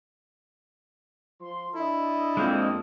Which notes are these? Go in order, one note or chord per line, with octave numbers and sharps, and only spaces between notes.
F3 C6
D4 E4 A4 D#5
F2 G#3 A#3 C4